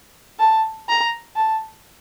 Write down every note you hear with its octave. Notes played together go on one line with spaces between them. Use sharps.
A5
A#5
A5